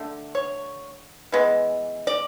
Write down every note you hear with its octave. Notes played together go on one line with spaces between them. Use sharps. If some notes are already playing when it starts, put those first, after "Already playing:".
Already playing: D3 A3
C#5
E3 G#3 B3
D5